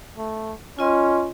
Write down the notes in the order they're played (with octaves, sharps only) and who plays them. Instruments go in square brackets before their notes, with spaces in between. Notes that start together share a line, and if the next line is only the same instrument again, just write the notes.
[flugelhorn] A3
[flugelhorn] C#4 [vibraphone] F4 D#5 C6